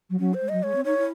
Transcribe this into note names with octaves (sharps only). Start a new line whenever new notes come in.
F#3
F#3 C#4
C5
G#3
F#3 D#5
G#3 C#5
C4
D#4 C#5
E4